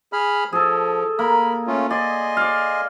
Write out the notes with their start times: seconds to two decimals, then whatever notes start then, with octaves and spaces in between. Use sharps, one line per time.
0.13 G#4 B5 F6
0.53 F3 G#4 A4
1.19 A#3 A#4 B5
1.67 A3 C#4 F4
1.90 D5 D#5 G#5 C6
2.37 D5 F5